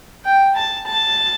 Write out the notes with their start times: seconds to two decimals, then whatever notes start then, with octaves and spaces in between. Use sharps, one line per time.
0.25 G5
0.56 A5
0.87 A5